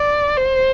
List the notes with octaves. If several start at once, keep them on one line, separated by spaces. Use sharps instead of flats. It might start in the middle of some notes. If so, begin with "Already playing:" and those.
Already playing: D5
C5